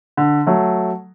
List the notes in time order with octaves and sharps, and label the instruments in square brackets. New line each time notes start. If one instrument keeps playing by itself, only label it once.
[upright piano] D3
F#3 A3